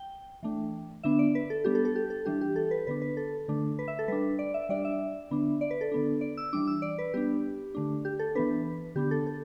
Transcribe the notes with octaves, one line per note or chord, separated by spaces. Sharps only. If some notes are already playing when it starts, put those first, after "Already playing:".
Already playing: G5
E3 A3 D4
D3 B3 D4 E5
D5
B4
A4
G3 B3 D4 G4
A4
A4
G4
A4
E3 G3 D4 G4
G4
A4
B4
D3 B3 D4 B4
B4
A4
D3 A3 D4
B4
E5
A4
G3 D4 B4
D5
E5
G3 D4 D5
E5
D3 B3 D4
D5
B4
A4
D3 B3 D4
D5
E6
E3 G3 D4 D6
E6
D5
B4
G3 B3 D4 G4
D3 A3 D4
G4
A4
E3 B3 D4 B4
D3 B3 D4 G4
A4
A4